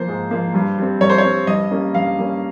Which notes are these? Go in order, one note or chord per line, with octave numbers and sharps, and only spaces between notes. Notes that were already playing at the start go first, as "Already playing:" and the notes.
Already playing: F3 A#3 C5
G#2
F3 A#3
G2
G3 C4
G2 C#5
C5
C#5
G3 C4
G2 D#5
G3 A#3 C#4
G2 F5
G3 A#3 C#4